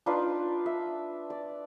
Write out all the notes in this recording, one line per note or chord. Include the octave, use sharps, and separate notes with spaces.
D4 D#4 F4 B4
E5
D5